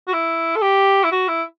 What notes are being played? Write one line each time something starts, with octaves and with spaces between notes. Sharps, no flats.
F#4
E4
A4
G4
E4
F#4
E4